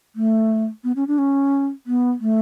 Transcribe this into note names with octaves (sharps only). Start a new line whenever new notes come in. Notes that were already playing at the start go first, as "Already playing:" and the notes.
A3
B3
C#4
D4
C#4
B3
A3